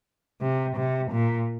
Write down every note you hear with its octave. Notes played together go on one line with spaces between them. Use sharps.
C3
C3
A#2